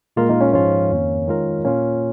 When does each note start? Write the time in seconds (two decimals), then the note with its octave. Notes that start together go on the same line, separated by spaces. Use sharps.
0.16 A#2 G#3 A#3 F4 A#4
0.29 A#3 D#4
0.41 C#4
0.53 G#2 F3 G#3 C#4 F4
0.91 F2 D#3 A#3
1.27 D#3 G#3 F4 A#4
1.65 A#2 A#3 C#4 F4